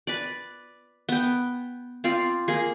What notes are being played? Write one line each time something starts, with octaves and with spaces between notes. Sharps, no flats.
B4 D5
B3 G5
C4 F4 D5 F5
A#3 G#4